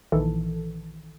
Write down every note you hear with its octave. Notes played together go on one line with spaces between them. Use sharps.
A#1 D#3 E3 A4